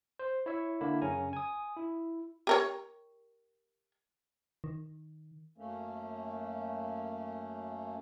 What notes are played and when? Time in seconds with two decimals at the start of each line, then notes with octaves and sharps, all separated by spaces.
0.19 C5
0.46 E4 C#5 E5
0.81 D3 A#3 E4
1.02 F#2 C#3 C#4 G#5 A#5
1.33 G#5 D#6
1.77 E4
2.47 G4 A#4 C#5
4.64 D#3
5.58 F#2 A3 A#3 C#4